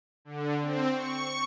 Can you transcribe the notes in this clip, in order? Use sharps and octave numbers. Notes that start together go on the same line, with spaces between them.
D3
C4
C#6